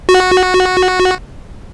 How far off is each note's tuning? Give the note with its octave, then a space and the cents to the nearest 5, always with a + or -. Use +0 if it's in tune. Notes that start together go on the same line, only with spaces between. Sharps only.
F#4 -10